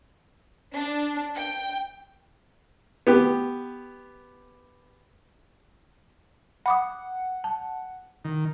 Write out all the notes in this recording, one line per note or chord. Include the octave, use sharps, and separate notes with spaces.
D4
G5
B3 G4
F#5 B5 D6 D#6
A5
D#3